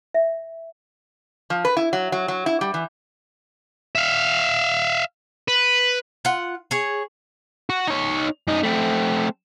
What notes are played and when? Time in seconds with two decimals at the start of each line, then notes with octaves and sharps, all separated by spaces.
0.14 E5
1.50 F3
1.65 B4
1.77 E4
1.93 F#3
2.12 F#3
2.28 F#3
2.46 E4
2.61 G3
2.74 E3
3.95 E5 F5
5.48 B4
6.25 F4 F#5
6.71 G#4 C#5
7.70 F#4
7.88 D#4 C#5
8.47 F#2 D#4
8.63 A3 C4